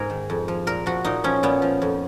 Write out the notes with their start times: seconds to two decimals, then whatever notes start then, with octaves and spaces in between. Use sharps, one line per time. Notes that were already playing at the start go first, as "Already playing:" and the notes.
Already playing: G#2 G#4 A#4
0.10 D#3
0.30 F2
0.48 F3
0.67 A#2 A#4
0.86 F3 F#4
1.05 A#2 D#4
1.24 F3 C#4
1.43 A#2 B3
1.62 F3
1.82 F2